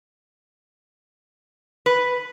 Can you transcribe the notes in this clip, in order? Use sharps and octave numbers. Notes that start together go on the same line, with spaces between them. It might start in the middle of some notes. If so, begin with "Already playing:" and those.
B4